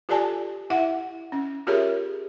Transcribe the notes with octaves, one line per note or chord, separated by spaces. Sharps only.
F4 G4 A4 D5 G#5 A5
E4 E5 F#5
C#4
F4 G4 G#4 A#4 C#5 E5